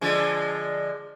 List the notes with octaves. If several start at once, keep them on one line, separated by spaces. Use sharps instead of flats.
D3 F3 G#3